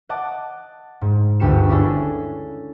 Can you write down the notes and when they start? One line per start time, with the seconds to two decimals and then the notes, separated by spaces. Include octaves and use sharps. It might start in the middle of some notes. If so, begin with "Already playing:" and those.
0.09 D#5 F#5 A5 D6
1.01 G#2
1.40 G1 D2 G4 C#7 E7
1.69 C#4 D4 E4 G#4 A4